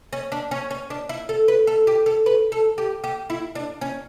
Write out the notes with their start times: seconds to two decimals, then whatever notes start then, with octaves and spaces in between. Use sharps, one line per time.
0.13 C#4
0.32 D4
0.51 C#4
0.71 C#4
0.90 D4
1.09 E4
1.29 A4
1.48 B4
1.67 A4
1.87 G4
2.06 A4
2.26 B4
2.52 A4
2.78 G4
3.04 G4
3.30 E4
3.55 D4
3.81 C#4